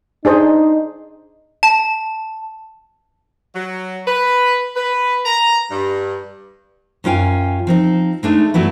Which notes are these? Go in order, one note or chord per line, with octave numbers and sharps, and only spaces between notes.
D4 D#4 G#4 C5
A5
F#3
B4
B4
A#5
G2
F#2 C#4 F4 G5 G#5
F3 C4 D#4
G#3 A3 D4 D#4
G2 F#3 A3 B3 E4